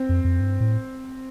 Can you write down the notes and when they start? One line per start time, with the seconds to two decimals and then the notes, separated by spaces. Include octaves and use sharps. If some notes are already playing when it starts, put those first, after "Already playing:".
Already playing: C4
0.09 F2
0.24 F2
0.40 G2
0.60 A2